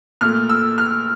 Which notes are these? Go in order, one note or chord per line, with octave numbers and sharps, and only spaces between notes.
A#2 A3 F6
E6
F6